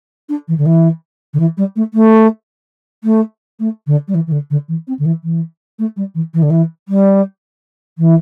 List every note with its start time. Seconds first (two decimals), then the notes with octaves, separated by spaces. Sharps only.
0.29 D4
0.48 E3
0.58 D3
0.66 E3
1.33 D3
1.39 E3
1.57 G3
1.76 A3
1.94 A3
3.04 A3
3.59 A3
3.87 D3
4.08 G3
4.14 E3
4.27 E3
4.31 D3
4.50 D3
4.68 E3
4.87 C4
4.99 D3
5.05 E3
5.23 E3
5.79 A3
5.96 G3
6.14 E3
6.34 E3
6.42 D3
6.50 E3
6.88 G3
7.98 E3